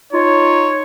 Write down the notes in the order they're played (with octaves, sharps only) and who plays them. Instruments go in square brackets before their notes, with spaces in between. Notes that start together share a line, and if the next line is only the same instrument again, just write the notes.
[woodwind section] D#4 F4 [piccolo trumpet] C#5